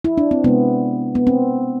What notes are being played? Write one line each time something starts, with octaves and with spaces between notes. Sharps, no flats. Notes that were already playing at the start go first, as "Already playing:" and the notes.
E4
D4
C4
C3 G#3 B3
B3
C4